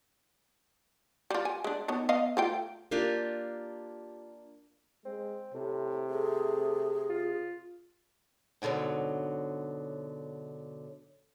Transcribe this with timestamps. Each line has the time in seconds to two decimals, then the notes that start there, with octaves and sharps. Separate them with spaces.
1.30 G3 F4
1.45 G#5
1.64 G#3 D4
1.88 D#3 B3 C#5
2.09 B3 D#5 F5
2.37 A3 F4 G5
2.91 A#3 D4 F4 G4
5.05 G#3 C4
5.54 A2 C3
6.10 A3 G#4
7.09 F4
8.62 G#2 B2 D3 D#3 F#3